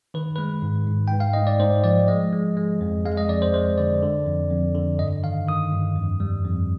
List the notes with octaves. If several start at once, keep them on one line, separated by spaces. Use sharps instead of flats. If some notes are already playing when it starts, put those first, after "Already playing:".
D#3 B4
G#3 B4
G#2
G#2
G#2 G5
F5
G#2 D#5
D5
G#2 C5
F3 D5
G#3 D#5
G#3
G#3
F2
G#3 F5
D#5
F2 D5
C5
G#3 C5
D3 D5
D3
F2
F2
D3
G2 D#5
D#3 F5
D#3 D#6
G2
F2
G3
F2